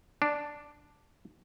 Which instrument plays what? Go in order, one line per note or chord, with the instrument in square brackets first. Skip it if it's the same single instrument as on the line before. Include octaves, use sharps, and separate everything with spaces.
[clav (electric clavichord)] D4